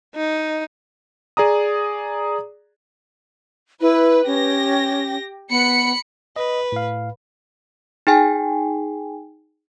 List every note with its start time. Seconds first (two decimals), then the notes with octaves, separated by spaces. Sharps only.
0.16 D#4
1.37 G#4 D5 A#5 D#6
3.81 E4 B4
4.27 C#4 G4 A#6
5.50 B3 B5 C#7
6.36 B4 D#5
6.72 A2 F5
8.07 D#4 G#4 G5 G#5